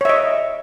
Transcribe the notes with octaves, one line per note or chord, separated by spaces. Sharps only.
C#5 D#5 E5